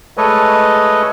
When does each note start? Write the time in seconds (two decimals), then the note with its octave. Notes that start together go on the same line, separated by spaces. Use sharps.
0.18 G#3 A3 A4 B4 C#5 D#5